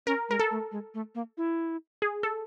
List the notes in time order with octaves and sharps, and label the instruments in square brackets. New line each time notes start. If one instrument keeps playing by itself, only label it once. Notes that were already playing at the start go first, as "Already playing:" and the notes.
[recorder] C#4 [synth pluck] A#4
[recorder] G#3 [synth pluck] A#4
[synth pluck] A4
[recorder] A3
G#3
A3
A#3
E4
[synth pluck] G#4
A4